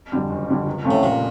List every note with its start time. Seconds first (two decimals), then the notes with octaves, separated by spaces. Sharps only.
0.12 F2 D3 G3
0.30 F#1
0.48 F2 D3 G3
0.66 C#2
0.84 C3 F3 A3 C#4
0.91 A2
1.03 C#2 A#2